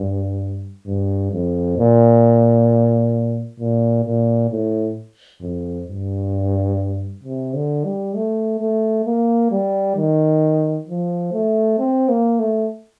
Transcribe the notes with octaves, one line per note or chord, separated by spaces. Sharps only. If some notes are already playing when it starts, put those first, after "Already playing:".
Already playing: G2
G2
F2
A#2
A#2
A#2
A2
F2
G2
C3
D3
G3
A3
A3
A#3
G3
D#3
F3
A3
C4
A#3
A3